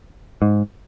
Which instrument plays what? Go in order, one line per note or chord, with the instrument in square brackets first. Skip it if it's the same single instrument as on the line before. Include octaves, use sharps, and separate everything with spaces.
[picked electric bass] G#2